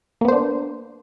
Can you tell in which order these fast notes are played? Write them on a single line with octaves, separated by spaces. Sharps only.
A#3 B3 C5 D4